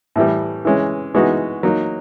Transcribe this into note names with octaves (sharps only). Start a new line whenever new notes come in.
A2 E3 G3
E3 G#3 C#4
E3 G#3 B3 D#4 F#4
F#3 A#3 D#4